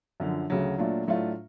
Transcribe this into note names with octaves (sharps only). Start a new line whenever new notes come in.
F#2 D3 F3
D2 C#3 F#3
A#2 F#3 A3 D4 F4
A2 F#3 A3 D4 F4